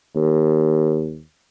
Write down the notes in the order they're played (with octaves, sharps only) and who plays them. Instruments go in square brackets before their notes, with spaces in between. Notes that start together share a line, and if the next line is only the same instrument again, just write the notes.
[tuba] D#2